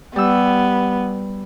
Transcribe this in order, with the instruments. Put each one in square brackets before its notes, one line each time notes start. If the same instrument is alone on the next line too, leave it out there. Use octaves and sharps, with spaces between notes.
[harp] G3 E6 [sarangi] B3